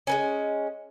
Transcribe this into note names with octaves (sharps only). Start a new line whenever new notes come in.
G#3 B3 C#4